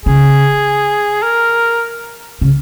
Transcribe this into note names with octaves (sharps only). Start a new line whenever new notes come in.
C#3 G#4
A#4
C#3